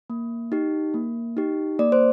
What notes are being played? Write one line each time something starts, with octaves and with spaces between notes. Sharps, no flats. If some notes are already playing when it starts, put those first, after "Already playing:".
A#3
D#4 G4
A#3
D#4 G4
A#3 D5
C5